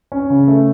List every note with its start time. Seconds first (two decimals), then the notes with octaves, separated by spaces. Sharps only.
0.12 C#4
0.30 C#3
0.48 A3